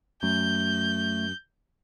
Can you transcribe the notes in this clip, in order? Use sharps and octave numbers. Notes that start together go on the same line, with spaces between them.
F#2 A3 G6